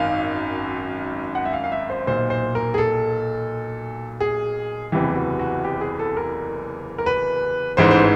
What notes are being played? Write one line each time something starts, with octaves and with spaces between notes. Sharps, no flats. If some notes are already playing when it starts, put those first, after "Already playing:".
Already playing: G#1 F#2 D#3 F5
F#5
E5
F5
F5
E5
C5
B1 A#2 C5
C5
A#4
G#4
A4
G#4
F#1 E2 C3 E3 G4
F#4
F#4
G4
G#4
A4
A#4
A#4
B4
A1 G#2 E3 C5
C5